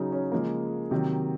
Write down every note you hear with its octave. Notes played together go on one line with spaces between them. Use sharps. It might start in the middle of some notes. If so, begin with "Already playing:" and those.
Already playing: C#3 F#3 C#4 D#4
C#4
C#3 F3 G#3 A#3
C3 D#3 F#3